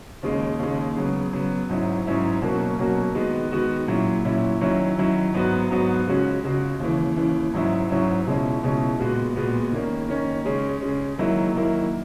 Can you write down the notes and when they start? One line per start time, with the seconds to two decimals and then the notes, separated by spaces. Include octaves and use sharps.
0.23 D#2 C#3 G#3 D#4
0.59 D#2 C#3 G#3 D#4
0.96 C#3 F#3 B3
1.33 C#3 F#3 B3
1.69 G#2 F#3 C#4 E4
2.05 G#2 F#3 C#4 E4
2.41 B2 F#3 A#3 C#4 F#4
2.78 B2 F#3 A#3 C#4 F#4
3.15 D#3 G#3 B3 F#4
3.51 D#3 G#3 B3 F#4
3.88 A#2 F#3 C#4 E4
4.25 A#2 F#3 C#4 E4
4.61 D#3 F#3 C#4 E4
4.97 D#3 F#3 C#4 E4
5.34 G#2 F#3 B3 F#4
5.70 G#2 F#3 B3 F#4
6.07 C#2 C#3 G#3 C#4 F#4
6.43 C#2 C#3 G#3 C#4 F#4
6.80 D#2 C#3 E3
7.16 D#2 C#3 E3
7.53 G#2 F#3 C#4 E4
7.90 G#2 F#3 C#4 E4
8.26 C#2 B2 G#3 C#4 E4
8.62 C#2 B2 G#3 C#4 E4
8.99 A#2 G#3 B3 F#4
9.36 A#2 G#3 B3 F#4
9.72 D#3 A#3 C#4
10.08 D#3 A#3 C#4
10.45 C#3 G#3 C#4
10.81 C#3 G#3 C#4
11.18 D#3 F#3 A#3 E4
11.54 D#3 F#3 A#3 E4